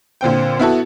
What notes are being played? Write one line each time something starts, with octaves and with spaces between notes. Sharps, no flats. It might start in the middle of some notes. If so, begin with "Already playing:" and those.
A#2 D3 C4 G5
B3 E4 F#4 A4